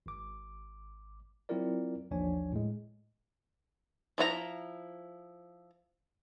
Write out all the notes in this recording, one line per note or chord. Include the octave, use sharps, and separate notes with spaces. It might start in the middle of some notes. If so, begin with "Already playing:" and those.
G#1 D6
F#3 C4 E4 F4 A#4 D5
A1 D#2 F3 D4 C#5 G#5
A2 G#3
F3 E4 F4 A#5